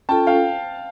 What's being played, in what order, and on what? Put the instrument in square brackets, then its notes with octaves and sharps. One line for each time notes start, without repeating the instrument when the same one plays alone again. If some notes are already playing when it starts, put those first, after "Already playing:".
[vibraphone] C#4 F4 A4 [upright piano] G5 A5
[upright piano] F5 G5